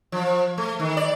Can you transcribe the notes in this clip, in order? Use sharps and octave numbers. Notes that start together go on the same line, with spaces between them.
F3
A3
D#3
D5